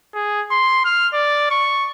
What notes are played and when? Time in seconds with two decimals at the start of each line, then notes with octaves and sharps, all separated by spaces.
0.14 G#4
0.51 C6
0.85 F6
1.14 D5
1.50 C#6